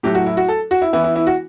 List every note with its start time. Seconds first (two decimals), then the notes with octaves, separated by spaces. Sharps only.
0.03 A2 F#3 A3 G4
0.15 F#4
0.26 E4
0.37 F#4
0.48 A4
0.71 F#4
0.82 E4
0.93 E3 B3 E4
1.04 E4
1.16 E4
1.27 F#4